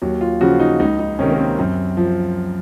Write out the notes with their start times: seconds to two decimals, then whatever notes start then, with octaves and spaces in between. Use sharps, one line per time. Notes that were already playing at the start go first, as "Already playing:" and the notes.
0.02 D#2 F#3
0.21 F4
0.41 C#3 F3 F#4
0.60 D#4
0.80 C#2 D#4
0.99 D#4
1.19 C3 D#3 C#4
1.30 A#3
1.38 C4
1.59 F#2
1.97 F3